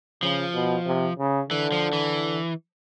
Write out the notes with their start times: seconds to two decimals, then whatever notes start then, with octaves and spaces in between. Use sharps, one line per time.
0.23 C#3 F3
0.54 B2
0.86 C3
1.19 C#3
1.50 D3 E3
1.72 F3
1.93 E3